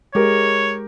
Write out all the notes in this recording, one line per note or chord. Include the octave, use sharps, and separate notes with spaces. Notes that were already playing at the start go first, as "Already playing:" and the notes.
G#3 G4 A#4 C#5